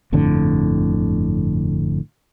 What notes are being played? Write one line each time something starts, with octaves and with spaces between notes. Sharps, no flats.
G1 F2 A2 D3